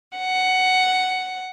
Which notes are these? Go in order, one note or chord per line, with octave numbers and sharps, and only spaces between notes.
F#5